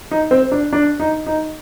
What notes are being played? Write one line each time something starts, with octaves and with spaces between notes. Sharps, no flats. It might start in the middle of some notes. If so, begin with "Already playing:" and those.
D#4
C4
D4
D4
D#4
D#4